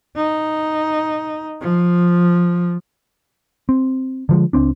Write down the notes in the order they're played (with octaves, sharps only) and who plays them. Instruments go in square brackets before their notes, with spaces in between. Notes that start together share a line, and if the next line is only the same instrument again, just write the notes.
[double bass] D#4
F3
[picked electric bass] C4
D3 F3 G#3
C#2 C4 D4